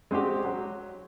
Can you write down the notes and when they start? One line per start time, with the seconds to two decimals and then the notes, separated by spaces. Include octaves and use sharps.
0.11 G#3 C4 F#4 G4
0.45 F#3